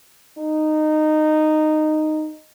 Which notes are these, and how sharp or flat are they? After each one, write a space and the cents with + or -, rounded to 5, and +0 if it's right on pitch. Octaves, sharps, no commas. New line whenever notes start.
D#4 -15